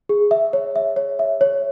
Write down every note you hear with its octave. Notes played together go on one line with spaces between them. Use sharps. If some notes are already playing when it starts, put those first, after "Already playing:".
G#4
E5
C#5
E5
C#5
E5
C#5